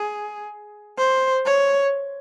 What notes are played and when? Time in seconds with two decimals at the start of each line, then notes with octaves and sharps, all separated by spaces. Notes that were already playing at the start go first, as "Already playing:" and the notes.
Already playing: G#4
0.98 C5
1.46 C#5